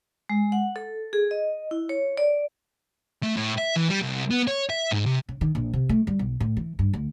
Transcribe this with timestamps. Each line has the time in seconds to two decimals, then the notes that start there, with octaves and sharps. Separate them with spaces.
0.29 G#3
0.52 F#5
0.76 A4
1.13 G#4
1.31 D#5
1.71 E4
1.89 C#5
2.17 D5
3.23 A3
3.37 A2
3.58 E5
3.76 E3
3.89 G3
4.02 C2
4.31 B3
4.47 C#5
4.70 E5
4.91 G#2
5.06 C3
5.29 C#3
5.41 D#3
5.55 A#1
5.73 C3
5.89 A3
6.07 G3
6.19 B1
6.40 A2
6.57 E3
6.79 G2
6.93 D2